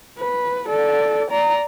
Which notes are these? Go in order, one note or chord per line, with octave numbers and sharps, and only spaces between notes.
B4
A4 D5
D5 A#5